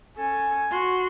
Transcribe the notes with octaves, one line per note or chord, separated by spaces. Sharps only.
C#4 A4 G#5
F#4 C6